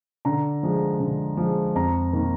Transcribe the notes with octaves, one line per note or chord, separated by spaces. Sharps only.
D3 A#5
F3 G#3
D3
F3 G#3
F2 A#5
D#3 A#3